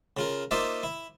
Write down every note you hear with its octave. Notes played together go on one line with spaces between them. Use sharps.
C#3 F4 A#4
A#3 D#4 F4 C5 D5 E5
E4